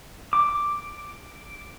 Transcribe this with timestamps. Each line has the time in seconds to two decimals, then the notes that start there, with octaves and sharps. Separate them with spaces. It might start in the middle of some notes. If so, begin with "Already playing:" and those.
0.33 D6